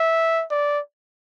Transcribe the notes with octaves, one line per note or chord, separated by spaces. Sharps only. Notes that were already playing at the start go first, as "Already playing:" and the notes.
Already playing: E5
D5